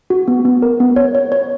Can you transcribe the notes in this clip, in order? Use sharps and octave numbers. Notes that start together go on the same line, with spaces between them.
F#4
B3
B3
A#4
B3
C#5
C#5
C#5